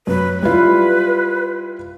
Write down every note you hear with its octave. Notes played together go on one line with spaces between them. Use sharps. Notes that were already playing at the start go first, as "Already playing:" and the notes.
F#2 B4
G3 E4 F4 B4